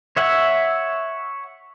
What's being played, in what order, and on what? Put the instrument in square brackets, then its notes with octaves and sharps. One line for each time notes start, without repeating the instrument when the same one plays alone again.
[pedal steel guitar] C#5 E5 F#5